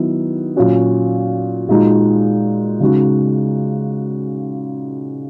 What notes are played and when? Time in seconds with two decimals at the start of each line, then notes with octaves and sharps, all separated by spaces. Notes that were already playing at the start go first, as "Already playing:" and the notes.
Already playing: D#3 F#3 B3 E4
0.56 A#2 F#3 C#4 F#4
1.69 A#2 G#3 D#4 F#4
2.80 C#3 G#3 D#4 F#4